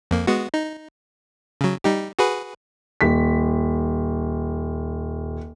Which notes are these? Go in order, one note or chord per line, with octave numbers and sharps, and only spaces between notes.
F2 A#3
G#3 B3 F#4
D#4
C#3 F#3
G3 D#4 G4
F#4 G#4 B4
D#1 B6